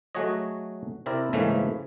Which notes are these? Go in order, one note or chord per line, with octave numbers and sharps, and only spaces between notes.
F#3 A3 F#4 G#4 C#5 D#5
C3 C4 E4 A#4 D5
G#2 C#3 E3 A3 A#3